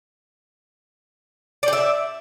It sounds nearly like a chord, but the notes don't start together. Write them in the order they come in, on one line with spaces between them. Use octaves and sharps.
D5 G5 E5